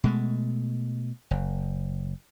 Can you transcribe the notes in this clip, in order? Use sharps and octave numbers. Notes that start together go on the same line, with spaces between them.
B2 G#3 A3
F#1